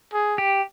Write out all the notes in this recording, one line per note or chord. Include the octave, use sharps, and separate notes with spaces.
G#4
G4